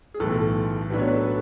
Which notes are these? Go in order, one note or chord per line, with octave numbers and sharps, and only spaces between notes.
G#4
B1 A2 E3 A4
A2 F#3 B3 D4 B4
C#5
B4
A4